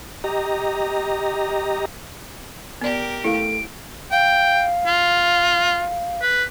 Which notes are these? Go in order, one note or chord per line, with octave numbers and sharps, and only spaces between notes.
G4 D#5 A#5
B3 G4 A#4 D5
A3 E4 F5 D7
F5 G5
F4
B4